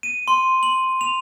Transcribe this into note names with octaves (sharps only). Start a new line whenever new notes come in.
D#7
C6
F#7
F7